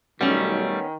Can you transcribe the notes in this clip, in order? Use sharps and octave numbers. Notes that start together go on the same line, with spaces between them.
B1 D#3 G3 A3 B3 C#4